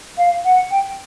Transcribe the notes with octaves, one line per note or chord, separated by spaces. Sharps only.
F5
F#5
G5